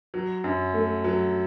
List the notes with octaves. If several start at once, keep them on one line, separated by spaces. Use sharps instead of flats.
F#3
F#2
A3
F#3